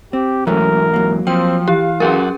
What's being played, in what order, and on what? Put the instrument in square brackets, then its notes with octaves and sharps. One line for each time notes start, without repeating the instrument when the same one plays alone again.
[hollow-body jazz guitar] C4 [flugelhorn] G4
[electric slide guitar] G#2 E3 [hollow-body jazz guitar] F#3 A3 C#4 [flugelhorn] A#4
[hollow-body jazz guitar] F#3 A#3
[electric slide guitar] F3 [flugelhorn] C4 [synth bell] G5
[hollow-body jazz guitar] E3 [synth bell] G4 [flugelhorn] F5
[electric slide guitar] F#2 F#4 [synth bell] C#4 G#4 A#4